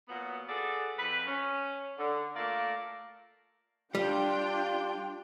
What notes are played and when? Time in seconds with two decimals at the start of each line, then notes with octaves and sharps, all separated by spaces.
0.08 A#2 F#3 B3
0.48 F#4 G#4 A4 B4 D5
0.98 F2 B4
1.26 C#4
1.98 D3
2.35 A3 A#3 F4 A#4 D5
3.95 G3 D4 F4 G5